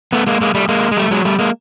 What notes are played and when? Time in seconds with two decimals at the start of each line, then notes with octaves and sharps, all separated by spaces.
0.13 A3 B3
0.27 G#3 A#3
0.41 G#3 A#3
0.55 G3 A3
0.69 G#3 A#3
0.91 G#3
0.97 G3 A3
1.11 F#3 G#3
1.25 G3 A3
1.39 G#3 A#3